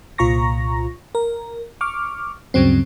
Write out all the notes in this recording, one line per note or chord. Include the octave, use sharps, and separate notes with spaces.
C2 A#2 F4 A#5 C#6 A#6
A#4
C#6 D6 F6
D2 G2 C#3 F#3 C4